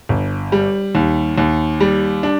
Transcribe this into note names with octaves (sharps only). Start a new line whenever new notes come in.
G1
G3
D#2
D#2
G3
D4